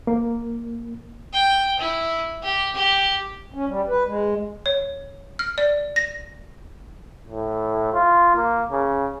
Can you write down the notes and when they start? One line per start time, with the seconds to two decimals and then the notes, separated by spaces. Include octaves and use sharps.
0.07 A#3
1.33 G5
1.79 E4
2.43 G4
2.75 G4
3.54 C#4
3.68 G3
3.88 B4
4.07 G#3
4.66 C#5
5.39 F6
5.58 D5
5.96 A#6
7.29 A2
7.94 F4
8.36 A#3
8.72 C#3